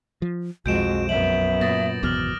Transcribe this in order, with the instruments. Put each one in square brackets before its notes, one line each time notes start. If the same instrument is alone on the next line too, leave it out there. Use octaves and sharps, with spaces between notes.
[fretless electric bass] F3
[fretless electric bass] B1 F3 [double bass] F2 G#3 [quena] F#4 [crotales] G6 D7 E7
[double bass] F#2 B3 [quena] E5 [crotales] F#7
[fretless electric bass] A#2 [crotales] D#6 A6 A#6
[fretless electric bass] G#1 E2 B2 [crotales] D6 F6 F#7